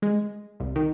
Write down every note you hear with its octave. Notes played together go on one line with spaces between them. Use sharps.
G#3
C2
D#3